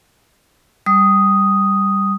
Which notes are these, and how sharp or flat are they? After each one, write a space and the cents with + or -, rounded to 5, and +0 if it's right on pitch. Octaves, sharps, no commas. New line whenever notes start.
G3 +0 D#6 +0